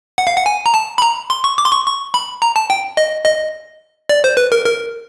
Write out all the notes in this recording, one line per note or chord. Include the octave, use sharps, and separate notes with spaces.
F#5
F5
F#5
G#5
A#5
A5
B5
A#5
C6
C#6
D6
C6
C#6
C#6
B5
A#5
A5
G5
D#5
D#5
D5
C5
B4
A#4
A#4